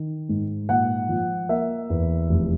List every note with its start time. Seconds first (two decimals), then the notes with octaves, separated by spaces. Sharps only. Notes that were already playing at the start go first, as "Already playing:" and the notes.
Already playing: D#3
0.29 G#2
0.69 A#2 F#5
1.09 F3
1.49 A#3 E5
1.90 E2
2.29 F1